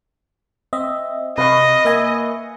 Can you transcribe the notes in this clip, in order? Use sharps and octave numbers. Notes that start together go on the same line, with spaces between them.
C4 D#5 E5
C3 B4 D#5 F5 C#6
A#3 E5 G#5